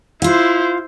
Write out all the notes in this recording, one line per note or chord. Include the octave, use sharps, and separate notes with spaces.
E4 F4 C5 F5